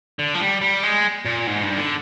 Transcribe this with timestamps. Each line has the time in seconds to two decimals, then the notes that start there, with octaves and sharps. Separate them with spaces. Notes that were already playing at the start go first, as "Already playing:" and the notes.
0.19 D3
0.35 F3
0.41 G3
0.61 G3
0.83 G#3
1.25 A#2
1.47 G#2
1.63 G2
1.78 D3